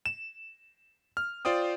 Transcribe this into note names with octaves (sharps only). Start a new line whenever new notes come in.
E7
F6
F4 C5 D5 G5 D#6